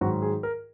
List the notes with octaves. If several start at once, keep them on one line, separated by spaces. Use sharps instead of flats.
G#2 D#3 F#3 F#4
G#4
A#4